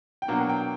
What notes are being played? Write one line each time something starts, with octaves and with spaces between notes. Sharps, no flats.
G5
B2 F#3 A#3 D4 F#5
G5